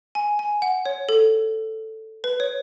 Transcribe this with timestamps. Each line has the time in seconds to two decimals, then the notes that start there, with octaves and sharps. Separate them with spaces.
0.15 G#5
0.39 G#5
0.62 F#5
0.85 C#5
1.09 A4
2.24 B4
2.40 C#5